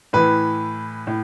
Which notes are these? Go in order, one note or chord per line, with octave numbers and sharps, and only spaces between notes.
A2 E3 B4
A2